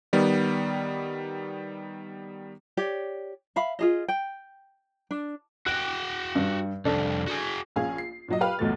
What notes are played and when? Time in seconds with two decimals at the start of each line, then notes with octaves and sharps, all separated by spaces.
0.13 D#3 G3 B3
2.77 G4 C#5 D5
3.56 E5 F5 B5
3.79 F4 G#4 D#5
4.08 G5
5.11 D4
5.66 F#4 G5 F#6
6.35 G2
6.85 C2 F2 D4 A4
7.27 F#4 G#4
7.76 A#1 C#4 G#4 F5
7.98 C7
8.28 A#2 F#3 D#5
8.41 G4 B4 F5 F6
8.59 B1 E2 A2 A3 A6